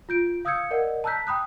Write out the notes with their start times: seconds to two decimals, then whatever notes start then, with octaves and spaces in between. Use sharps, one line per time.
0.09 F4 G6 D7
0.45 F5 D#6 E6 G6 G#6 C#7
0.71 A#4 D5 D#5 F#5
1.04 A5 A#5 E6 F#6 G6 B6
1.27 G5 B5 D#6 F#6